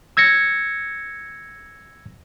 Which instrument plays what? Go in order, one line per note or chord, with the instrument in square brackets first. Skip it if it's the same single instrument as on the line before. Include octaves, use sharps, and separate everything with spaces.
[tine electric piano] E6 G#6 A#6 C#7